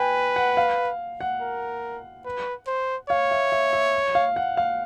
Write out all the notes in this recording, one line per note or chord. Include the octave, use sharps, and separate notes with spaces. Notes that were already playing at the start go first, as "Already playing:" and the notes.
Already playing: B4 G5 G#5
F#5
F5
F#5
A#4
B4
C5
C#5 F5
E5
E5
E5
F5
F#5
F5